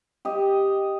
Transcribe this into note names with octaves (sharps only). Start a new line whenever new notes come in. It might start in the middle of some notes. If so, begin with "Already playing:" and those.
G4 D#5